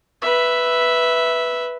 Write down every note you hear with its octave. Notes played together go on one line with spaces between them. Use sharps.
B4 E5